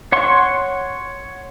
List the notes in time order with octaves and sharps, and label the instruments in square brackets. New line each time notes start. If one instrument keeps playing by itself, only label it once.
[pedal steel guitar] C#5 F#5 C6 C#6